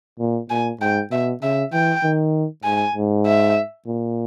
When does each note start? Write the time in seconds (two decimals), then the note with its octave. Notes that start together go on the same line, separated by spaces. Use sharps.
0.19 A#2
0.50 A#2 G#5
0.80 G#2 G5
1.11 B2 E5
1.42 C#3 E5
1.73 E3 G5
2.03 D#3
2.64 G#2 G#5
2.95 G#2
3.26 E5
3.87 A#2